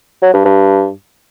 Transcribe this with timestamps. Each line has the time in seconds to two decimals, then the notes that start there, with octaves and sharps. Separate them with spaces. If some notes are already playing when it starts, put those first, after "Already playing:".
0.22 F#3
0.33 G2
0.45 G2